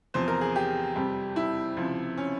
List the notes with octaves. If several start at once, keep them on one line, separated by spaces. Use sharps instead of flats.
E2 C3 F3 C5
A#4
G#4
G4
F2 C3 G3
E4
C#2 C3 F3
C#4